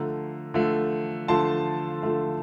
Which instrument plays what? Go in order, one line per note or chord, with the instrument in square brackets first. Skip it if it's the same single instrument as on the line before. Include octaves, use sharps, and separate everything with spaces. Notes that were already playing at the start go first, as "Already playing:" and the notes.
Already playing: [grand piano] D3 F3 A3 A#5
D3 F3 A3
D3 F3 A3 A5 C6
D3 F3 A3